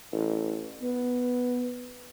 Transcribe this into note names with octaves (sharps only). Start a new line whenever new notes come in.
A1
B3